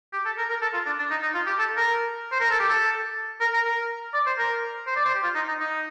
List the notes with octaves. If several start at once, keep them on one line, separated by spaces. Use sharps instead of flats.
G4
A4
A#4
A#4
A4
F4
D4
D4
D#4
D#4
F4
G4
A4
A#4
C5
A#4
A4
G4
A4
A#4
A#4
A#4
D5
C5
A#4
C5
D5
C5
G4
F4
D#4
D#4
D#4